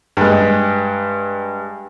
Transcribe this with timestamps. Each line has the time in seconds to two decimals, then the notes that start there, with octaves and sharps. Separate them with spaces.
0.17 G2 G#3